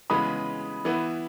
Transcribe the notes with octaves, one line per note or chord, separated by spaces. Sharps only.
C#3 E3 G#3 B3 B5 D#6
E3 B3 E4